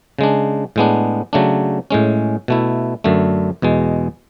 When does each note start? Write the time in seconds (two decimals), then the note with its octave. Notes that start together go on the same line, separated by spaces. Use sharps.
0.19 C#3 G#3 D4
0.76 A2 G#3 B3 D4
1.33 C#3 F#3 A3 D4
1.91 A2 G#3 C#4
2.48 B2 A3 E4
3.04 F#2 D3 A3
3.62 E2 B2 G#3